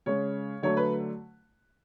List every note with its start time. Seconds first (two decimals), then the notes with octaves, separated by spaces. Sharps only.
0.06 C#3 G#3 C#5
0.63 D3 F#3 A3 C#5
0.77 B4